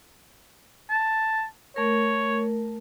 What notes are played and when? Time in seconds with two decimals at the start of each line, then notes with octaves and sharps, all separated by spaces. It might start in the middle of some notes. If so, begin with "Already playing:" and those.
0.90 A5
1.76 A3 A#4 C#5